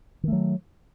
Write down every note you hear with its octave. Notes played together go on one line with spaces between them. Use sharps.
D#3 F#3 A3